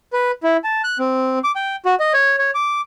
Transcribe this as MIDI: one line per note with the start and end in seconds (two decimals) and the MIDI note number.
0.13 0.31 71
0.43 0.57 64
0.64 0.82 81
0.84 0.98 90
0.99 1.39 60
1.44 1.52 86
1.56 1.76 79
1.85 1.95 66
2.00 2.13 75
2.13 2.36 73
2.39 2.51 73
2.55 2.81 86